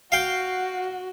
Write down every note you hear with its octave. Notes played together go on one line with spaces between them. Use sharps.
F#4 F5 G5